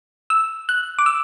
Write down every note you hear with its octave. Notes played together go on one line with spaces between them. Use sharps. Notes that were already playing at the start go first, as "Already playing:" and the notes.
E6
F#6
D6
E6